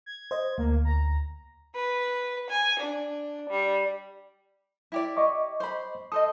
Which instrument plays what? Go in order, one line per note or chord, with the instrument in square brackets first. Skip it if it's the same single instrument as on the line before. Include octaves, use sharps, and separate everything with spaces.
[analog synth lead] G#6
[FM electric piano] C5 D#5
[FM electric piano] D2 [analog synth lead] A#3
[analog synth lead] A#5
[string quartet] B4
G#5
D4
G3
[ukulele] E4 G4 D5
[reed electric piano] D#5 C#6 D6
[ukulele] C5 B5
[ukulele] A4 C5 D#5 [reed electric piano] D#6